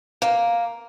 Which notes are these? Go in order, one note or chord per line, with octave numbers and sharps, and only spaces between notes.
A#3